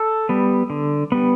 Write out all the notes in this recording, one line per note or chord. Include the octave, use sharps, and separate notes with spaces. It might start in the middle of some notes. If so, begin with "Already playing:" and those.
Already playing: A4
G3 B3
D3
G3 B3